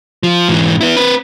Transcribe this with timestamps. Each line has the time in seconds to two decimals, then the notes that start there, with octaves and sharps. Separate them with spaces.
0.23 F3
0.48 G#2 E3
0.81 B3 E4
0.97 C4 B4